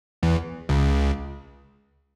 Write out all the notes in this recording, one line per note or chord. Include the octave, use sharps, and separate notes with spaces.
E2 E3
C#2 C#3